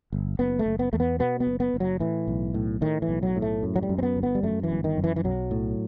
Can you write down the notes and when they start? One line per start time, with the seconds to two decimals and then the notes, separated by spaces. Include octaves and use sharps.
0.12 G1
0.39 F#1 B3
0.59 A3
0.66 F#1
0.79 B3
0.93 E2 A3
1.00 B3
1.19 B2 B3
1.40 B3
1.47 F#1
1.60 B3
1.74 F#1
1.80 F#3
2.00 A2 E3
2.28 B1
2.54 A2
2.81 A2 D#3
3.02 E3
3.09 B1
3.23 F#3
3.36 A2
3.42 A3
3.63 F#2
3.76 F#3
3.83 G3
3.89 F#2
3.98 C4
4.03 B3
4.17 G1
4.23 B3
4.35 G3
4.43 F#2 A3
4.63 E3
4.71 G1
4.84 D#3
4.97 F#2
5.04 E3
5.16 E3
5.24 B1 F#3
5.51 A2